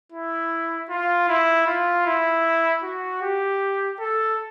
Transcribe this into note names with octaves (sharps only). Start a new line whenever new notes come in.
E4
F4
E4
F4
E4
F#4
G4
A4